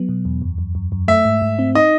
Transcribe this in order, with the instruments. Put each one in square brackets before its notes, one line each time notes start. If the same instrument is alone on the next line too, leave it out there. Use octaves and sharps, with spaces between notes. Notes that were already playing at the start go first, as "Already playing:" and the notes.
Already playing: [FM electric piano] F#3 B3
B2
E2
F#2
F#2
F#2
F#2
[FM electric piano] A3 [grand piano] E5
[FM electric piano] G#2
G#2
C4
[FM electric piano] D#4 [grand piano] D#5